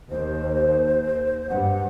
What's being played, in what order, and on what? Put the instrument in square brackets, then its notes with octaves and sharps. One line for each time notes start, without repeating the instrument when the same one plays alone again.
[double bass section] D#2 [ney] C5
[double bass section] G2 [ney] F#5